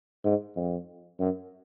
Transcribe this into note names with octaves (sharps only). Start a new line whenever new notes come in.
G#2
F2
F#2